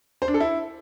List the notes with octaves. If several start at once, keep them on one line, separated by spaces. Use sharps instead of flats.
C5
D4
A4
E4